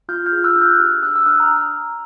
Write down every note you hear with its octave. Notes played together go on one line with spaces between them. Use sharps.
F4 F6 G6
F6 G6
G#4
E6 F#6
D4
F6 G6
G4
D4 E6 F#6
E6
D4 D#6 F6
A#5